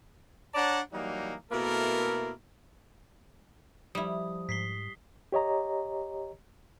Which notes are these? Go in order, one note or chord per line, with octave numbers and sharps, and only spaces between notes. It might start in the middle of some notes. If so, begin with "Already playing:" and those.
D4 C#5 D5 F#5 A5 A#5
E3 F#3 G3 A#3 D#4
B2 A3 A#3 E4 A4 A#4
F3 G3 E4 D#6
G#2 B6 C7 G7
G4 C#5 D#5 A#5